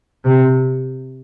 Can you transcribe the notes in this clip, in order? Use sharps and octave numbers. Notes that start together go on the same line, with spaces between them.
C3